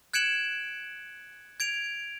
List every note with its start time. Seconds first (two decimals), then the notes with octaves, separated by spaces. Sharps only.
0.13 F#6 G#6 C#7 D7 E7 F#7
1.60 G#6 D7 F7